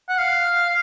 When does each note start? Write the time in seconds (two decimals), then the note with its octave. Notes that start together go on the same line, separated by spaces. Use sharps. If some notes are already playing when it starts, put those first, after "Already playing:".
0.09 F#5
0.18 F5